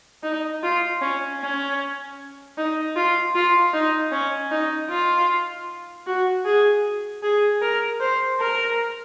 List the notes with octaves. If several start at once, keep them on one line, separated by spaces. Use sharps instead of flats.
D#4
F4
C#4
C#4
D#4
F4
F4
D#4
C#4
D#4
F4
F#4
G#4
G#4
A#4
C5
A#4